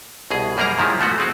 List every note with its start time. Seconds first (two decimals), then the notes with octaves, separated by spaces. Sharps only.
0.31 C2 B2 G#4
0.57 F#2 G3 A#3 G#4 A#4 A#5
0.78 G#2 D#3 F3 G#3 E4
0.99 F3 A3 B3 F#4
1.18 G#3 C4 F#4